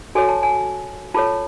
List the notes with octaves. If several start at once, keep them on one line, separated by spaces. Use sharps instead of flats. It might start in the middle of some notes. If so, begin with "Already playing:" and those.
F#4 A4 C#5 G#5
A5
G#5
F4 A4 C#5 A5